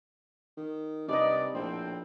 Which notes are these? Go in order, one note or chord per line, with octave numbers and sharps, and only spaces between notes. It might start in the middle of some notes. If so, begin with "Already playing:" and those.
D#3
G2 C3 D#4 B4 D5 D#5
A#1 A2 C4